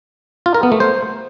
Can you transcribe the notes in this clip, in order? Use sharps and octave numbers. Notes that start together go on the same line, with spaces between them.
F4
A#4
B3
A3
C5